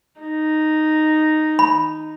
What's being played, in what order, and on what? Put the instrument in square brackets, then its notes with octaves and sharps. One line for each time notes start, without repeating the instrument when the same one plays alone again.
[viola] D#4
[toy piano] B5